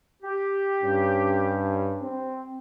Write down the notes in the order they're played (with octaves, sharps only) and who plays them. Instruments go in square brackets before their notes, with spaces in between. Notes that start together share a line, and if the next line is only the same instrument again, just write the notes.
[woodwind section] G4
[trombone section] G2 C#4
C4